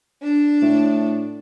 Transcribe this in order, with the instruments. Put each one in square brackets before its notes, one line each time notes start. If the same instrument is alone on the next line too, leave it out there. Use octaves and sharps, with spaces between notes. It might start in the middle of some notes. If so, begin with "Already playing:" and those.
[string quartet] D4
[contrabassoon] A2